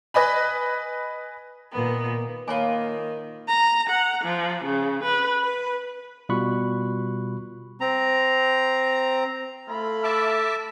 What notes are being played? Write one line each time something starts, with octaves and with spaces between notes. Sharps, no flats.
B4 D#5 G#5 B5
A#2 D#3 B3
D#3 A#3 F4 C#5 G#5 B5 D6
A#5
F#5
F3
C#3
B4
B4
B2 G3 F4 B5 C#6 F#6
C4 A#5
A3 E4 F4 B5
E5 A5 D6 E6